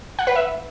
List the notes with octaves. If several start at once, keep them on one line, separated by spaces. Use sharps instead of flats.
F#5
B4
E5